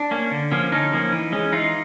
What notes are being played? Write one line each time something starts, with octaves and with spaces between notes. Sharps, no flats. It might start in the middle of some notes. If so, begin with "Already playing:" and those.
Already playing: D4
A#3 C#4
D3
F3 A#3 C#4
D3 C#4 D#4
F3 A#3 C#4
E3
G#3 C#4
E3 D#4 F4